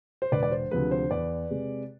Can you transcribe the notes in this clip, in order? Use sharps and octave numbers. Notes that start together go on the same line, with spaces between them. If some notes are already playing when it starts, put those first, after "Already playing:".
C5
E1 B4 D5
D5
C5
D2 C3 F3 G#3 B4
C5
E2 B4 D5
C3 G#3